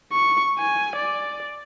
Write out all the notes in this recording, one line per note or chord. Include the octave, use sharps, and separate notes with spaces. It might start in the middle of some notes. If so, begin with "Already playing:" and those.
C#6
G#5
D5